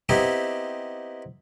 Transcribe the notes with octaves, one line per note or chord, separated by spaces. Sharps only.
B3 C4 D#4 E4 G4